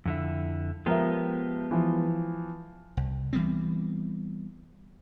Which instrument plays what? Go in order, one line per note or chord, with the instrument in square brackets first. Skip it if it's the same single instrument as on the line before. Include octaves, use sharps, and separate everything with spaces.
[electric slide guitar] F2 D3 E4
[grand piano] F3 A#4 E5 [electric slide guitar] G#3 B3 G4
[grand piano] E3 F3
[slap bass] C2
E3 G3 B3 C4